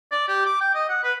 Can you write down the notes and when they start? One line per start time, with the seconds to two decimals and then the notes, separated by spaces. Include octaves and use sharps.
0.12 D5
0.28 G4
0.46 D6
0.61 G5
0.75 D#5
0.89 F#5
1.03 B4